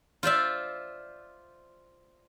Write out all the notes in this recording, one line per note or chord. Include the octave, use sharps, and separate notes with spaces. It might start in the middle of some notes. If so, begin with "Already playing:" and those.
F4 C5 D5 E5